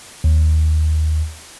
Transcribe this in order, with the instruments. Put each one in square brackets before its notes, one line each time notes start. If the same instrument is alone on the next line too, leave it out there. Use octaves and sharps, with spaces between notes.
[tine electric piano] D#2